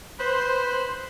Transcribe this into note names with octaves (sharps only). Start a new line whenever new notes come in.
B4 C5